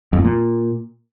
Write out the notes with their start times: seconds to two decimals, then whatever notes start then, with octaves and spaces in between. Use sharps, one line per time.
0.13 F2
0.19 A2
0.25 A#2